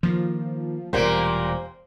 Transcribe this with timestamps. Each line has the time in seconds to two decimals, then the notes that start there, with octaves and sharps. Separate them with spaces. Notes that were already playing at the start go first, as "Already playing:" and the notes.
0.03 D#3 F3 A#3
0.93 E1 E2 A#2 G3 A#3 G4 C5